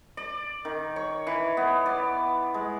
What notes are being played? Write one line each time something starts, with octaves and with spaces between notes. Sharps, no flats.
D5
D#3
C#5
E3
B3
D5
G#3